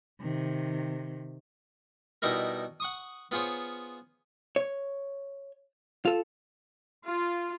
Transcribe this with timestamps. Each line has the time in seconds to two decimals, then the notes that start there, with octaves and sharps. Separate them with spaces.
0.21 C3 D#3
2.22 B2 G3 D#4 E4 A#4
2.80 F#5 C#6 D#6
3.31 B3 F4 G#4 C5 C#5
4.56 C#5
6.05 F4 A4
7.06 F4